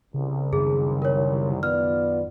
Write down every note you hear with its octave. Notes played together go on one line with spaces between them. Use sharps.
C2 C#3
F#2 D#3 G#4
A#4 C#5
B3 F4 D5 F6